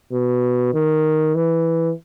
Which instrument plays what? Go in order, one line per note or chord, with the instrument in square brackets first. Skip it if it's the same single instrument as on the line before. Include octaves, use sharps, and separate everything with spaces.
[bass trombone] B2
D#3
E3